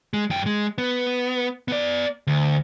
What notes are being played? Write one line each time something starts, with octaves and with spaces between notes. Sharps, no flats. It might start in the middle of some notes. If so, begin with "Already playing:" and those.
G#3
F#2 G5
G#3
B3
B3 D5
D2